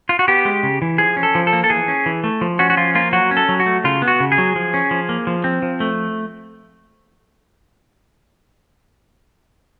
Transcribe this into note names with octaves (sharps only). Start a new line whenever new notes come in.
F4
F#4
B3 G4
G#3
C#3
E3
F3 G#4
C#4
A4
F3
A4
A#3
A4
E3 G#4
C#4
E3
A3
F3
C#4 F#4
F#4
F3 F4
A#3 F4
F#3 F#4
C#4
A4
F#3
F#4
A3
C#3 F4
B3
F#4
C#3
G#4
F#3
F3
C#4
F3
A#3
F3
C4
F3
A3